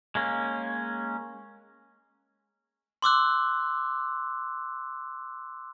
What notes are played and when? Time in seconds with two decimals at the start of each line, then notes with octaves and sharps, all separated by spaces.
0.15 G#3 A#3 C#4
3.02 C6 D6 E6 F#6